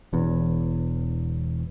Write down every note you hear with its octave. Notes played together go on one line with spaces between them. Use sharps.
E1 E2